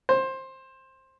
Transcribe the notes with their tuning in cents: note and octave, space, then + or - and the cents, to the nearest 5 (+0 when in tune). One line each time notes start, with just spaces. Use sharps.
C5 +15